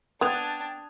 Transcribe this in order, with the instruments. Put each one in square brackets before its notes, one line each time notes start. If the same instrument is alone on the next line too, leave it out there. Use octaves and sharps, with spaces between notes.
[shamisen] B3 [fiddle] D4 A5 [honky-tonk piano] G5 G#6 F7 [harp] D#6 F#6